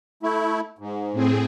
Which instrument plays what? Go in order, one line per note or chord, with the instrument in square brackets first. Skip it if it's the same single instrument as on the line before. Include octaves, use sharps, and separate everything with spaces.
[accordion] A3 E4
G#2
[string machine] A2 C4 G#4